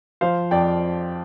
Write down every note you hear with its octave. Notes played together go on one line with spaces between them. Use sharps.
F3 C5 F5
F2 D5 G5